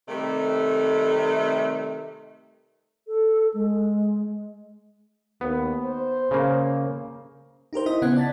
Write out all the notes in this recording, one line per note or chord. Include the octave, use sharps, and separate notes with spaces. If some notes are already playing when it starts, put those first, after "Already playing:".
C3 D#3 G3 A3
A4
G#3
D#2 B3
C5
C#3 A#3
D#4 G4 A#4 C5
E4 D#5 D#6
C#3 B3 F#5 F#6 G#6
D5 A5 A6 B6